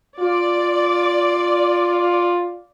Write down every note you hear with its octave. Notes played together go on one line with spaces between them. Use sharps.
F4 D5